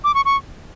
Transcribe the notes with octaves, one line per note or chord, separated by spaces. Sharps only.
D6
C#6
C#6